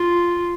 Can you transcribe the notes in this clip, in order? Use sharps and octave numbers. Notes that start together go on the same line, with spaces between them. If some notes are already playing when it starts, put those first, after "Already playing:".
Already playing: F4